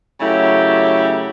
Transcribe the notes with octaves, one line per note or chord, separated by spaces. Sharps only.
C#3 F#3 A3 E4 G4